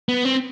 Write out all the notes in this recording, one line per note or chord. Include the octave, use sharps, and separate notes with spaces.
B3
C4